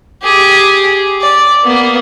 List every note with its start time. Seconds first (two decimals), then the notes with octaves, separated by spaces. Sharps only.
0.23 G4 G#4
1.20 D5
1.64 A#3 B3